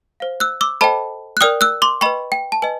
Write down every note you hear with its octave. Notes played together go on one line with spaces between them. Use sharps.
C5 F5
E6 F#6
D6 E6
A4 C5 D#5 G5 A5 B5
F#6
A#4 D5 G5 D#6 F6
E6 F#6
C6 D6
B4 D#5 G5 B5 C#6
G5
A5
B4 D#5 G#5